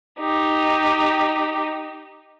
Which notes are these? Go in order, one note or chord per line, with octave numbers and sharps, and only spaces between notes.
D#4 G4